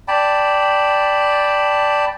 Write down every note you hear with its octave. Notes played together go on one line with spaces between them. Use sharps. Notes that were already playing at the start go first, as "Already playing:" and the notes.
D5 G5 A5 B5